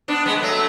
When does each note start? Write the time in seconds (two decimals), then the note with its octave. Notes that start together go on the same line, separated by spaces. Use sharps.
0.08 B3 D4
0.26 G#3 B3
0.36 B3
0.42 F#3 A3